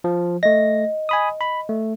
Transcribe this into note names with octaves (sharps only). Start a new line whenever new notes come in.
F3
A3 D#5 A#6
G#5 B5 D#6
B5
A3